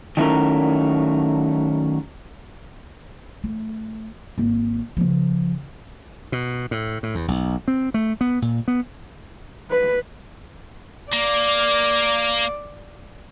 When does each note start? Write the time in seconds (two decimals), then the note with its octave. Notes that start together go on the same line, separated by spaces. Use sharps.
0.17 D#3 F#3 A3 C#4 E4 A#4
3.44 A3
4.38 G#1 A#3
4.97 C#3 F3
6.32 B2
6.71 A2
7.03 A2
7.15 E2
7.28 B1
7.68 C4
7.94 A3
8.21 B3
8.42 A#2
8.68 B3
9.70 B4
11.13 A#3 D5